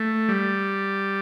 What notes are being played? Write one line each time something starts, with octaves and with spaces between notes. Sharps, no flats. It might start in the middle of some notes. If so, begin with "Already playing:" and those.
Already playing: A3
G3